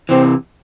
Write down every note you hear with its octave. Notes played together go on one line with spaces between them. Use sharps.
C3 E3 C4